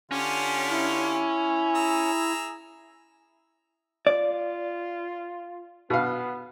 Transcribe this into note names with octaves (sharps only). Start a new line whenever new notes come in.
D3 C#4 F4 G4
E4
G#4 A#5 E6
F4 D5
B2 B3 F5